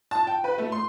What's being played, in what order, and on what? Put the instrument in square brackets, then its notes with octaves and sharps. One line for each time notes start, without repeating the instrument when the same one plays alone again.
[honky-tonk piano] A5
G5
B4
A3
C6